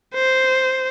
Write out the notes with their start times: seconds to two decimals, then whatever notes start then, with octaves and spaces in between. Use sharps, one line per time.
0.14 C5